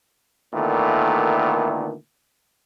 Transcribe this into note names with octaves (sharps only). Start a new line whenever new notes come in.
A#2 D3 D#3 A3 B3 E4